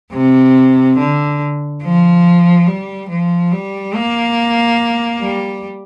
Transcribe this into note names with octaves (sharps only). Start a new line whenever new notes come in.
C3
D3
F3
G3
F3
G3
A#3
G3